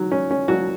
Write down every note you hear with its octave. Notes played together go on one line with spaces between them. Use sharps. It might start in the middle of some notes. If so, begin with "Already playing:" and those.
Already playing: D#3 F#3
C#4
C#4
F#3 F#4